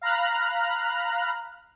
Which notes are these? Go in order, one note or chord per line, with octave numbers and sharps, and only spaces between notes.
F5 A#5 B5 F6 F#6